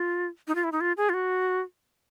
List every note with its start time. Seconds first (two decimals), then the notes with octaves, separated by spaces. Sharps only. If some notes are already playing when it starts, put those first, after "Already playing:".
Already playing: F4
0.47 D#4
0.55 F4
0.64 E4
0.72 D#4
0.81 F4
0.97 G#4
1.09 F4
1.14 F#4